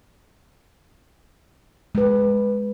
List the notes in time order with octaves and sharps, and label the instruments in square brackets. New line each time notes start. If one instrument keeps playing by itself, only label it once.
[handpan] G#3 B4